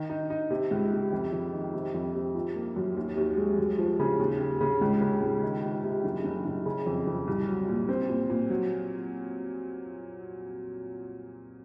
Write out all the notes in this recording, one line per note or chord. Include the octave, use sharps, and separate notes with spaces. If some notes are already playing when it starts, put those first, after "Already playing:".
Already playing: D#3
D#4
D#4
C3
C#2
C3
F2
F2
D#3
C3
F2
C3
F3
A#3
F#2
D#2
D#2
G#3
F#2
F3
C#3
D#2
D#2
C#3
C#2
C#3
C#2
D#3
C3
C3
F#1
F#1
F#1
C#3
F2
F2
C2
F#3
A#2
C4
A#2
A#2
F#3